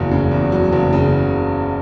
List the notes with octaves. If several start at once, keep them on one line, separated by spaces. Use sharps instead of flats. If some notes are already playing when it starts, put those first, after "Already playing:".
Already playing: F#1 E2 C#3 F#3
C#3
E2
F#3
F#1
C#3